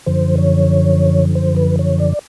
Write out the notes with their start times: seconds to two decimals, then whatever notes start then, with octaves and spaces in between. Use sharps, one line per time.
0.06 F#2 D3 F3 C5
0.38 C#5
1.35 C5
1.56 B4
1.79 C#5
2.00 D5